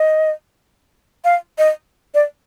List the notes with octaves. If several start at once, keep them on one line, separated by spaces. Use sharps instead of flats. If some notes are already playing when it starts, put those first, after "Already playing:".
Already playing: D#5
F5
D#5
D5